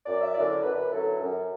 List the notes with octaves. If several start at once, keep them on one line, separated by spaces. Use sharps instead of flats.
F#2 D5
E5
D3 F#3 C#4 E4 D5
D5
F#2 B4
D3 F#3 C#4 E4 A4
F#2